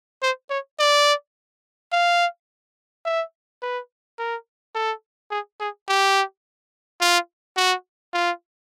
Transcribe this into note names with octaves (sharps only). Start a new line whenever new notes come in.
C5
C#5
D5
F5
E5
B4
A#4
A4
G#4
G#4
G4
F4
F#4
F4